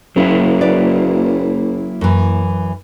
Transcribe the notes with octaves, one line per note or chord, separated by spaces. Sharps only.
F#1 F#3 A#3 E4
B4 D5
F#2 E3